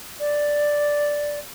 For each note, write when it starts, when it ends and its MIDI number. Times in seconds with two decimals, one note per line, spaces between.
0.20 1.39 74